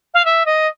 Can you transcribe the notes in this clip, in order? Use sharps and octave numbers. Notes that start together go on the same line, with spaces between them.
F5
E5
D#5